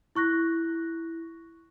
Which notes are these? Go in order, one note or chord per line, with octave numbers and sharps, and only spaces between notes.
E4 C#6 F#6 A#6